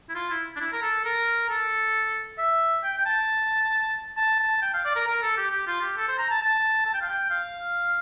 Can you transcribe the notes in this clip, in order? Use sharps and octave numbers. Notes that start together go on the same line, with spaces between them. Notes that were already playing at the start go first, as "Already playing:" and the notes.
E4
F4
E4
D4
E4
A#4
A4
A#4
A4
E5
G5
G5
A5
A5
A5
G5
F5
D5
A#4
A#4
A4
G4
G4
F4
G4
A4
C5
A#5
A5
A5
A5
G5
F5
G5
F5